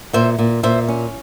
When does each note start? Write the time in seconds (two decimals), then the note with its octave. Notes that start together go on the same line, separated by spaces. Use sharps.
0.13 A#2 C5 E5
0.39 A#2
0.63 A#2 C5 E5
0.89 C#4